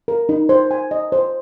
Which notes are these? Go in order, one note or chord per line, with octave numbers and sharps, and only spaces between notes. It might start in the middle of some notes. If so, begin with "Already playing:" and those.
A#4
D#4
C5
G#5
D#5
C5